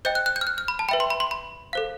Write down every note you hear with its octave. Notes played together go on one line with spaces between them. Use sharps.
C5 D#5 G5 G6
F#6
F#6
G6
F6
F#6
F6
B5
A5
B4 E5 G5 B5
C6
B5
C6
B5
A4 C5 F5